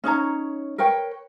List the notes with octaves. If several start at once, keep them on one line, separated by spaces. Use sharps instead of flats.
C#4 D#4 C#5 A#5
A#4 B4 C#5 G5